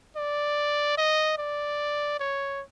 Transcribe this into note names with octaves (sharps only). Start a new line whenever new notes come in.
D5
D#5
D5
C#5